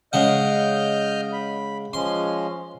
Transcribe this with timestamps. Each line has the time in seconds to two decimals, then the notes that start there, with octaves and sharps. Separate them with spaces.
0.13 C#3 G#3 D#5 F#5 F6 G6
1.33 B5
1.93 F3 G#3 C#4 C6